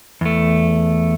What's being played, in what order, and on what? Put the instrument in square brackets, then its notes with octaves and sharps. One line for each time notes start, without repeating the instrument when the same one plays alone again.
[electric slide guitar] E2 A3